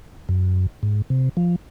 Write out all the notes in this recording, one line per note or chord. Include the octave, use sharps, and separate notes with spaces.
F#2
G#2
C3
F3